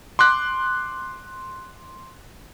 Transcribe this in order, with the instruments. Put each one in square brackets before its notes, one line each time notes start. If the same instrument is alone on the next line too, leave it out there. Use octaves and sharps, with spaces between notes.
[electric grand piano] C6 D6 F#6